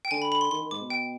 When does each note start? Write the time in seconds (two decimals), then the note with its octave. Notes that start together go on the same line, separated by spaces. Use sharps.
0.05 G5
0.11 D3 G#5
0.22 B5
0.32 B5
0.41 C6
0.51 D#3 C6
0.61 D#3
0.71 G#2 D6
0.81 B2
0.90 G5